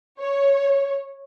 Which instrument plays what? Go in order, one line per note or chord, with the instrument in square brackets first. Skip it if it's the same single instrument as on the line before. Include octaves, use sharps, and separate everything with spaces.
[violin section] C#5